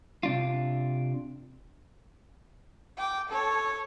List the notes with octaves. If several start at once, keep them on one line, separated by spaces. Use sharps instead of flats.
C3 D4 F4
G5 D6
A4 C#5